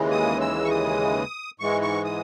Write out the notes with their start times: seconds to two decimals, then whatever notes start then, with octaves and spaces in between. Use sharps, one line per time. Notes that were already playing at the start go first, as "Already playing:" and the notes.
Already playing: D#2 C#3 E3 G#3
0.11 D#6
0.41 E6
0.65 C#6
0.70 D#6
1.60 G#2 E3 G#3 C#6
1.82 C#6
2.04 D#6